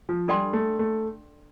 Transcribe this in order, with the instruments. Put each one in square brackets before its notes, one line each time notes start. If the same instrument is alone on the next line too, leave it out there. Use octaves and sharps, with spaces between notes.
[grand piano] F3
[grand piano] G3 [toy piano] D4 A4 D5 G5 C6
[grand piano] A3
A3